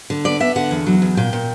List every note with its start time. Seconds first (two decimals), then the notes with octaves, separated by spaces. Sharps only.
0.10 D3
0.25 B3 D5
0.40 B3 E5
0.56 D3 F#5
0.71 E2
0.86 F#3
1.02 E2
1.17 A#2 G5
1.33 A#2